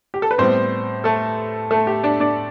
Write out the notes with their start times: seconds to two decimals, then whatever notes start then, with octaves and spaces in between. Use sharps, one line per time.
0.14 G4
0.22 A4
0.31 B4
0.38 A2 G3 B3 C4 C5
1.04 A3 A4
1.71 A3 A4
1.87 G4
2.04 D4 D5
2.20 D4 D5